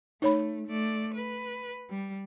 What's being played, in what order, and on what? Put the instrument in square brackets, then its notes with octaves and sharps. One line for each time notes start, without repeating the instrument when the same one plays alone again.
[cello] A3 [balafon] D#4 C#5 B5
[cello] A3 D5
B4
G3